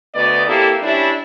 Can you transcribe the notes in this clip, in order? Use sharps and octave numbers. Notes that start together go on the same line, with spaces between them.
D2 B3 D5 D#5
A#3 C4 E4 G4 A4
G3 C#4 D4 E4